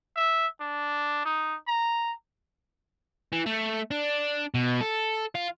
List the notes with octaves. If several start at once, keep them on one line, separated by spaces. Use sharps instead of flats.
E5
D4
D#4
A#5
E3
A3
D4
B2
A4
F4